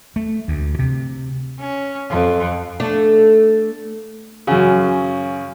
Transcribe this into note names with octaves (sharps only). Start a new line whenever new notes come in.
A3
D2
C3
C#4
F2
A3 D4
F#2 C#3